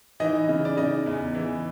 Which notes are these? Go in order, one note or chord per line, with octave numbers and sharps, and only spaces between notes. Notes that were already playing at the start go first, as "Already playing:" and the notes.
E3 D#4 D#5
C#3
D5
C#3 D#4 D#5
E2
E3